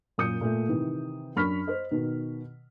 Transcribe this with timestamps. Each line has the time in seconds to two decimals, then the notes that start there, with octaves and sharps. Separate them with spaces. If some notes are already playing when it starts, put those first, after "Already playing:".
0.18 F#2 A#2 A#3 D#6 G6 C#7
0.41 A#2 A3
0.69 C3 D#3 E3
1.36 F#2 D4 B5 C#6 F6 B6
1.67 C5 D#5
1.91 B2 D#3